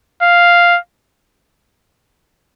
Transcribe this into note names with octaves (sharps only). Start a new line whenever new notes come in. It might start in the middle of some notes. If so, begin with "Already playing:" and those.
F5